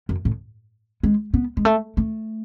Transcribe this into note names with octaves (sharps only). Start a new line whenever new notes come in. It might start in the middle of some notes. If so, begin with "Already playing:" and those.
F#2
A2
G#3
B3
G#3
A3
A3